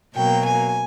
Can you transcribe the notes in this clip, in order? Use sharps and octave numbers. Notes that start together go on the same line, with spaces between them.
B2 F#3 A#3 G5
G#5